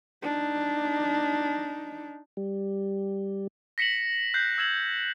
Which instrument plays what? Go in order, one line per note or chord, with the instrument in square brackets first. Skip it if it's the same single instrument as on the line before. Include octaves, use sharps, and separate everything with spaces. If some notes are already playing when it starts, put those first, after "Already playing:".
[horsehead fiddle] D4 D#4
[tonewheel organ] G3
[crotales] A#6 B6 C#7 E7 F#7
F#6 G6 C7
E6 G#6 E7 F#7